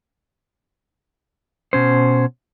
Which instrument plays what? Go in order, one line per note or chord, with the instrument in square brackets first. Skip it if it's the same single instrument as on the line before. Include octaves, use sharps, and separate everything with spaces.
[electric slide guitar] B2 C#4 C5